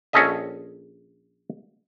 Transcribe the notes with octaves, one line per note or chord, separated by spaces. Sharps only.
A#1 C#4 G#4 A4 D#5 E5